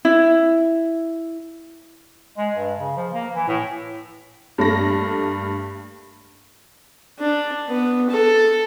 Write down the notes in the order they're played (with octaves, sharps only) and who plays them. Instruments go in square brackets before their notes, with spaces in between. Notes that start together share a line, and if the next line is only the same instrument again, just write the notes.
[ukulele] E4
[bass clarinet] G#3
G2
C#3
F3
A#3
E3
A2
[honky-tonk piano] G2 A3 A#3 A#6
[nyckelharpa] D4
B3
A4